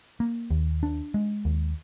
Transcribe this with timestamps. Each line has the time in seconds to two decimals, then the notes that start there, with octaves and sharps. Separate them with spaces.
0.20 A#3
0.50 D#2
0.83 D4
1.14 G#3
1.45 D#2